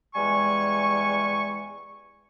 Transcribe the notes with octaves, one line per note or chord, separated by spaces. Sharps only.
E2 G3 G#3 G#5 C#6